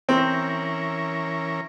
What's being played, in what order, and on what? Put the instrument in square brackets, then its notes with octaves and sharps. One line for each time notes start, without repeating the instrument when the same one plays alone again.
[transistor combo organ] E3 C#4 A#4 [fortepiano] C4